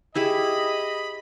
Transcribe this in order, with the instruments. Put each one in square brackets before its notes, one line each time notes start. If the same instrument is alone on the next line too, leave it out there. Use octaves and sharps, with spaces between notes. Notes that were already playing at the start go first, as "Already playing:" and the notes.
[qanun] E4 G4 G#4 [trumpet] D#5 [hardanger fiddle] B5